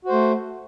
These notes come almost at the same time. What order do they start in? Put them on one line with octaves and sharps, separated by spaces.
F#4 C5 A3